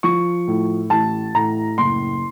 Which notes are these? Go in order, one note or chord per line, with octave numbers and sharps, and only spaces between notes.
F3 C#6
A2
A1 A5
A2 A#5
F#1 C6